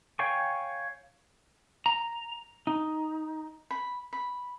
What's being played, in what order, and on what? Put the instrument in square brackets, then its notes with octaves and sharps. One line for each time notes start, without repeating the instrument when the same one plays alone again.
[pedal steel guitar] C#5 F5 G5 G#5 C#6
[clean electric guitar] A#5
D#4
[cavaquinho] B5
B5